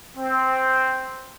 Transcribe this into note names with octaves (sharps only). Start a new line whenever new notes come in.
C4